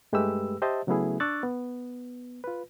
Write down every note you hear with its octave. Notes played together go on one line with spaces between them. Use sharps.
G2 G#3 A3 G4 B4 E6
G4 C5 D#5 E5 A5
C#3 F#3 A3 B3 E4 G#4
D4 C#6 D6 E6 F#6 A6
B3
F4 B4